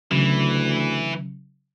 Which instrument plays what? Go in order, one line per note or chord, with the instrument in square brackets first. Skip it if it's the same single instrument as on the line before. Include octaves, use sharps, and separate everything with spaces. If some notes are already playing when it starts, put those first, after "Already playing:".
[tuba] D2 [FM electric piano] C#3 F#3 [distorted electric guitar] E3